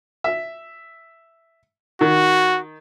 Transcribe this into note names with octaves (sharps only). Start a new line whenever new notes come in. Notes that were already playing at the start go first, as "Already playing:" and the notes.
E5
D#3 F#4